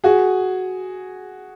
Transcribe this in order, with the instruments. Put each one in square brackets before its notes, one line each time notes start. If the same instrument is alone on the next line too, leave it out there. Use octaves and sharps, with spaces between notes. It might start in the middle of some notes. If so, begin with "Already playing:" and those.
[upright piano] F#4 G#4